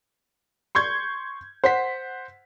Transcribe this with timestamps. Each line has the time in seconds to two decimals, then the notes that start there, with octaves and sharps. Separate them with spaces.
0.75 C6 C#6 G6 G#6
1.64 C5 F#5 B6